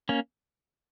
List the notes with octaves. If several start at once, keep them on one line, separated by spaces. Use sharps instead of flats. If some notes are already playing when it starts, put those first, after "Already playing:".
A#3 C#4